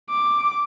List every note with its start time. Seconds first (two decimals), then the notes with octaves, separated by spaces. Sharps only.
0.11 D6